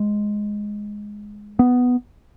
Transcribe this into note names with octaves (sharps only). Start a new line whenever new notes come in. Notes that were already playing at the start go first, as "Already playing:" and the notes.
Already playing: G#3
B3